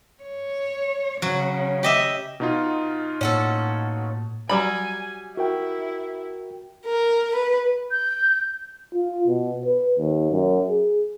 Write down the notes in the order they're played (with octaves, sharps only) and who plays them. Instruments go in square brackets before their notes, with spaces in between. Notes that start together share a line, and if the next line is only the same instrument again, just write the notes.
[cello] C#5
[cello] C#3 [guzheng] F#3
[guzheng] G4 D#5 E5
[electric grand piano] B2 D#4 F4
[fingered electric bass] A2 A#3 [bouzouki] C#4 F#4 A4
[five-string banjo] F#3 G3 B5 [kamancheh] G#5
[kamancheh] E4 [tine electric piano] F#4 A#4 G5
[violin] A#4
B4
[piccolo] G6
[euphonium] F4
B2
B4
D#2
F#2
G#4